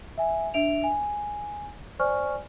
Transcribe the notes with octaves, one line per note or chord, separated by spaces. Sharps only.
E5 G#5
D4 E5 D7 F7
G#5
C5 D5 G#5 C#6 F6